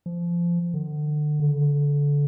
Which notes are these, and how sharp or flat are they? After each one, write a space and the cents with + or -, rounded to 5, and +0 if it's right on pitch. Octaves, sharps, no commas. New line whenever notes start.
F3 -20
D3 +35
D3 -25